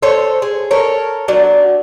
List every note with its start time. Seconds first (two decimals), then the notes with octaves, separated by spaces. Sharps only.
0.02 A4 C5 C#5
0.42 G#4
0.71 A4 A#4 C#5
1.28 F#3 D4